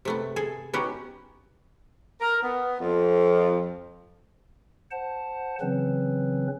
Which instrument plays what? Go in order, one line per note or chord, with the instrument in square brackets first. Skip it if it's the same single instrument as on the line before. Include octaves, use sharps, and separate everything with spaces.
[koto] C3 A3 B3
G#4 A4 G#5
B3 C#4 D#4 F#4 G4
[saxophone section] A#4
B3
F2
[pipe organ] C5 F#5 A5
C#3 E3 F#3 C4 C#4 B4